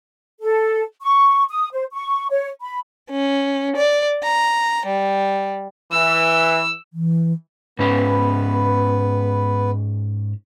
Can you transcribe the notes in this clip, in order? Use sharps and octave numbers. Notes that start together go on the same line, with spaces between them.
A4
C#6
D#6
C5
C#6
C#5
B5
C#4
D5
A#5
G3
E3 E6
E3
G#2 B3 C#4 B4